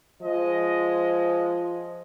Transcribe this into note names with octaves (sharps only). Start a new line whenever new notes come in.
F3 G#3 D#5